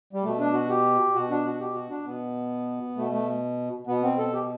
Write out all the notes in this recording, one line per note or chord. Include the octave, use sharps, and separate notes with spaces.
G3
B2 A3
D4
F#4
G4
B2 F#4
D4
F#4
G4
F#4
D4
B2 B3
B2 A3
A3
B2 B3
C4
A4
G4